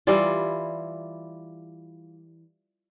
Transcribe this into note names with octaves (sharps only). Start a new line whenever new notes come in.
E3 G3 E4 F4